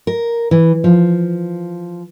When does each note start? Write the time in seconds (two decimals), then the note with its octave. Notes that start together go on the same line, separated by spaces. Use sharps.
0.07 A#4
0.51 E3
0.84 F3